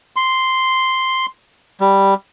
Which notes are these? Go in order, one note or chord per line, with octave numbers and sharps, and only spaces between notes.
C6
G3